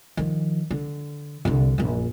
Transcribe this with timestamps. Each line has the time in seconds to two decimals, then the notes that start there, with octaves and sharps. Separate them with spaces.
0.17 D#3 F3
0.71 D3
1.45 C2 D3
1.78 A#1 F#2